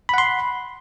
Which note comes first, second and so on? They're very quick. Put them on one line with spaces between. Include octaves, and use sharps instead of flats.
B5 F#5 C6